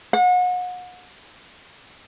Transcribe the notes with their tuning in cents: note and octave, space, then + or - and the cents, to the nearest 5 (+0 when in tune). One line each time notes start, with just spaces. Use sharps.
F#5 -35